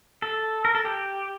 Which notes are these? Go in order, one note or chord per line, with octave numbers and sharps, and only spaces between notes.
A4
A#4
A4
G4